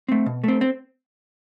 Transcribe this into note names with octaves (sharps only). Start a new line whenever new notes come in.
A3 C4
B2
A3 C4
C4